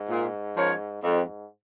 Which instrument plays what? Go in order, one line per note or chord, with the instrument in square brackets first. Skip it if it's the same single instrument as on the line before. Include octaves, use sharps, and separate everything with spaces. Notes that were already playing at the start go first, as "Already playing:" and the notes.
Already playing: [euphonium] G#2
[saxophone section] A#2
F3 C#4 A#4 C#5
[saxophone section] F2 [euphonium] G#2